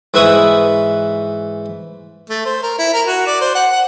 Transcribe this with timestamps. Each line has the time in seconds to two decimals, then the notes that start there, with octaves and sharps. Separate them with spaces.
0.14 G#2 E3 B4 E5 C#6 D#6
2.29 A3
2.46 C5
2.63 A#4
2.79 E4
2.94 A#4
3.06 F#4
3.27 D5
3.41 C5
3.55 F#5
3.71 F#5